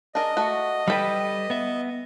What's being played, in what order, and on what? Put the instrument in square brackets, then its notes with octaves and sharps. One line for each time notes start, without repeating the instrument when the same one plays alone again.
[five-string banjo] D4 G#4 A#4 [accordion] D#5
[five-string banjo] A3 F#4
[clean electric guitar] G3 A4 B4 [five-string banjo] G5 B5
[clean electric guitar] B3 E5